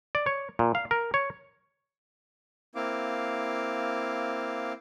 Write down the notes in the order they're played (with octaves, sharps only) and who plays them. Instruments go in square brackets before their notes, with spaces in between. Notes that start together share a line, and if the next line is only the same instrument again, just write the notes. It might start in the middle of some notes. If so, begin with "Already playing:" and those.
[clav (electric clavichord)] D5
C#5
A#2
F5
A#4
C#5
[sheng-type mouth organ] A#3 C4 E4 F5 D6